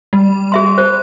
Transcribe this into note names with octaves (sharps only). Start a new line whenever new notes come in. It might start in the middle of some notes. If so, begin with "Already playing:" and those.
G3
G#4 E5 C6
C5